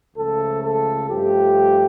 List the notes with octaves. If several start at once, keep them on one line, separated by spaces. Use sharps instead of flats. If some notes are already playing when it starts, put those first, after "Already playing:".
C#2 C#3 F3 A3 A4
A4
G2 F3 A3 G4